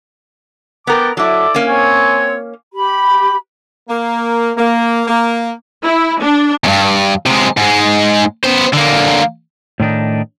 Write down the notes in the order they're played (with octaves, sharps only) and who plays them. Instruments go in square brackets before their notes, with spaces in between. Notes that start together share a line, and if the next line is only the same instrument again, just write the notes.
[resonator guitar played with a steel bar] B3 A#4 [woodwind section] F#5 G5 A5 [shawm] D6
[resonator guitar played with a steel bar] F#3 E4 [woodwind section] A4 D6 [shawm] D5
[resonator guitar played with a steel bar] A#3 C#4
[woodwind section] C4 C#5 [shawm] G#5
[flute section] G4 B5
[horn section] A#3
A#3
A#3
[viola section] E4
D4
[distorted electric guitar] E2 G2
C3 G#3
G#2 G#3
B3 C5
D3 A#3
[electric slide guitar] A2 D#3 D4 D#4